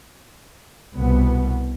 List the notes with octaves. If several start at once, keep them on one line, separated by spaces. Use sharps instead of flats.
C2 B2 B3